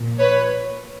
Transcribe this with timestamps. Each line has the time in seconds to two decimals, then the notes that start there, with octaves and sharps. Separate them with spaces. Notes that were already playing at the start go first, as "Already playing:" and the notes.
Already playing: A#2 F3
0.19 B4 C#5